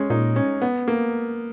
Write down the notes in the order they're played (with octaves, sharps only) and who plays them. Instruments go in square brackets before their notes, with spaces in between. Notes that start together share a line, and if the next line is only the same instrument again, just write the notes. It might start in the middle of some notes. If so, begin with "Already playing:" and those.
Already playing: [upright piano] G#3 C#4
[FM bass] A#2 [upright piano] D#4
[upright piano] C#4
B3
A#3